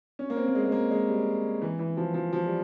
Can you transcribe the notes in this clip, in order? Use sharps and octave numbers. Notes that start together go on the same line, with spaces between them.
C#4
A#3
C4
A#3
G#3
G#3
A#3
G#3
G3
E3
E3
F3
F3
F3
G3